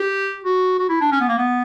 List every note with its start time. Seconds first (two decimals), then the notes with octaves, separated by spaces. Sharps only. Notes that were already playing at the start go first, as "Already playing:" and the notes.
Already playing: G4
0.44 F#4
0.79 F#4
0.89 E4
1.01 D4
1.12 C#4
1.21 B3
1.28 A#3
1.38 B3